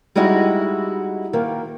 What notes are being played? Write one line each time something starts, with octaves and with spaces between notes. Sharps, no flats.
G3 G#3 D#4 E4 F#4
D#3 A#3